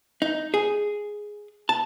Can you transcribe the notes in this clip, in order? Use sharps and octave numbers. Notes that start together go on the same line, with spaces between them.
D#4
G#4
A5